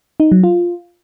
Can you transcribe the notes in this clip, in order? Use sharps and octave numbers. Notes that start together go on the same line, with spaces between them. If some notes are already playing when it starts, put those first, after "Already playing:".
D#4
F#3
F4